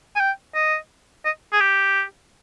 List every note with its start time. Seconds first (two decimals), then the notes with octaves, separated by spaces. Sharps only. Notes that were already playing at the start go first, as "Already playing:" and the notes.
0.16 G#5
0.20 G5
0.55 D#5
1.25 D#5
1.52 G#4
1.61 G4